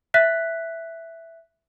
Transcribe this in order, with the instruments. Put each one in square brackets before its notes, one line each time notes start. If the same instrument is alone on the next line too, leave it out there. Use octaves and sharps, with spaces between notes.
[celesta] E5 F#6 B6